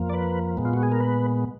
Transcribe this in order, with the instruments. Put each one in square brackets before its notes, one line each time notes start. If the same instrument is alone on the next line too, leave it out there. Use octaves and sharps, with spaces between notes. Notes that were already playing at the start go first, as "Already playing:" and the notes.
Already playing: [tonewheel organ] F2 F3 A#3
D5
B4
A#2 G#3 B3
F4
F#4
G#4
A#4
B4